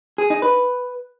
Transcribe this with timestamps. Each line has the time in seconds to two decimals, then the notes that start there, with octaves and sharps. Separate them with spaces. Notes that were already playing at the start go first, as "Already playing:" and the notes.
0.18 G#4
0.30 D#4
0.42 B4